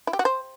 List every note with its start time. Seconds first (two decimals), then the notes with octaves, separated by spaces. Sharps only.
0.07 E4
0.13 G4
0.19 F#4
0.25 C5